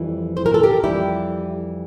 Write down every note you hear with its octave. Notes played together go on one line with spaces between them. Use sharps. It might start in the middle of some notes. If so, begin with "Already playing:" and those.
Already playing: F2 E3 G3
C5
A#4
A4
G4 A#4
F2 E3 G3 E4 G4